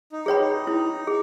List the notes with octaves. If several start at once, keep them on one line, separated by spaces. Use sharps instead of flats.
D#4
G#4 C#5 G5 B5
D#4
E4
G#4